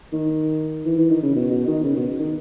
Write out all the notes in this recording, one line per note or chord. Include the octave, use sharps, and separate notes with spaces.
D#3
E3
E3
D#3
C#3
B2
B2
D#3
C#3
B2
D#3